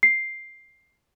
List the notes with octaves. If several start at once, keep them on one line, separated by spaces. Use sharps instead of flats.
C7